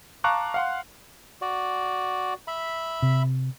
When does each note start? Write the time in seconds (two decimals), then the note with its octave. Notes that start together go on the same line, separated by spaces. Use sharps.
0.24 F5 A5 A#5 C#6 D6 F#6
0.54 F5 F#5 C6
1.42 F#4 D5
2.47 E5 B5
3.02 C3